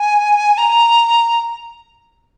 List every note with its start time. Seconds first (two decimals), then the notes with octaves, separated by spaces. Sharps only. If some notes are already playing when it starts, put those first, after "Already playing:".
Already playing: G#5
0.58 A#5